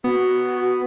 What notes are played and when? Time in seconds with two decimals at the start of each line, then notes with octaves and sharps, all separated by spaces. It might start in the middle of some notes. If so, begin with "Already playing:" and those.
0.04 B3 F#4